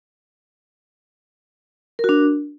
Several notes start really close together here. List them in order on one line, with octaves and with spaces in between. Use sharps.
A#4 F#4 D4